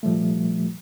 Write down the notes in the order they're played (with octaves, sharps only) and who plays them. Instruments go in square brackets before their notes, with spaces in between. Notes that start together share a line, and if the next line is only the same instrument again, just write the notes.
[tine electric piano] A#2 F3 G3 A3